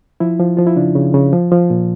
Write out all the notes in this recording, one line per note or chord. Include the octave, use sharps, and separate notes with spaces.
F3 E4
F3
F3 F4
E4
C#3 D4
C#3
C#3
F3
F3
A#2